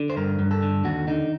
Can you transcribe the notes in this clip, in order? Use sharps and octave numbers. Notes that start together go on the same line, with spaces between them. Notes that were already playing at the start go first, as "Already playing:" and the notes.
Already playing: D3
C5
G2 A#4
G2
A4
D3
D#2 F#4
D3 D#4